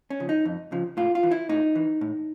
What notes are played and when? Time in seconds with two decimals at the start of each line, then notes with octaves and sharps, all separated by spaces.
0.10 C#4
0.20 C#3 F3
0.29 D#4
0.45 F2
0.72 C#3 F3
0.97 A2 F4
1.15 F4
1.23 E3
1.31 E4
1.49 A2 D#4
1.75 E3
2.01 A2